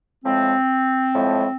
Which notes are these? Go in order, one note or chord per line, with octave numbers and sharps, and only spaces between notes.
A2 F3 G#3 C4
A2 F3 G#3